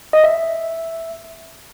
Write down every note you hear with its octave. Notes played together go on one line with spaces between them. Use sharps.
D#5
E5